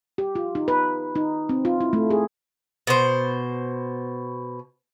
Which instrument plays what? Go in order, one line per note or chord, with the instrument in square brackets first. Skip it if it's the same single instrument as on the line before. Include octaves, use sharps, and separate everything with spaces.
[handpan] G4
F4
D#4
B4
D#4
C4
F4
E4
A3
G#4
[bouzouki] B2 C5